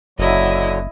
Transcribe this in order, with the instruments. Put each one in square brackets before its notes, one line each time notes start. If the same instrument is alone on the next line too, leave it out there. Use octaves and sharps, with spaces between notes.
[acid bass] F#1 [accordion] D3 F#3 [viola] E4 D#5